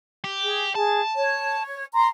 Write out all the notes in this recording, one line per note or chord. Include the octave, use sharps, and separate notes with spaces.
G4
G#4
G#4 A5
C#5
A#5 C6